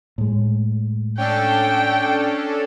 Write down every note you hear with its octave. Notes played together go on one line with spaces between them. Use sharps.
A2 G#3
C#4 D4 A4 G5